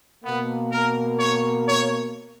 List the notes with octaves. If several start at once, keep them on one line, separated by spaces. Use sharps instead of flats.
B2 A#3 B3
A#4
C#5
C#5